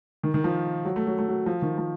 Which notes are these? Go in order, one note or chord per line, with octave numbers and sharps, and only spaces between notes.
D#3
D#3
F3
F#3
A3
F#3
A3
F#3
F3
D#3
F3